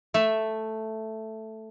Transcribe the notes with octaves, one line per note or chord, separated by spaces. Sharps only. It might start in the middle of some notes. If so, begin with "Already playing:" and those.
A3 E5